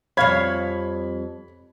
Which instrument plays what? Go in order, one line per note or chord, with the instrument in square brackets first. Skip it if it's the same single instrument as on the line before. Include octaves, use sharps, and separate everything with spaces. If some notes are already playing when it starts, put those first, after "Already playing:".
[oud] F2 G3 [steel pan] C#5 F5 [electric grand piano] B5 G#6